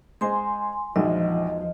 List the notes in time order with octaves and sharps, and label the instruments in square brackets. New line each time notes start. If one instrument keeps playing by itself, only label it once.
[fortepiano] G#3 C5 D#5 [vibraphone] G#5 C6
[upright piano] A#1 [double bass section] E2 F3 [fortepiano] D#3 F#3 G#3 [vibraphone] D#5